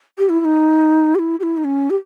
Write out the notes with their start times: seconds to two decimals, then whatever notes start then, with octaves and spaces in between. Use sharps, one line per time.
0.18 G4
0.29 E4
0.40 E4
0.45 D#4
1.15 G4
1.19 E4
1.40 G4
1.43 E4
1.57 D#4
1.64 C#4
1.90 G4